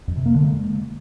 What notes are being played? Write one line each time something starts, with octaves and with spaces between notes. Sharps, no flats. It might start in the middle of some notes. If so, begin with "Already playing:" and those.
F2
C3
A#3
D3
G#3